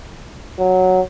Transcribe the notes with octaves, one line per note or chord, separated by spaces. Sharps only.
F#3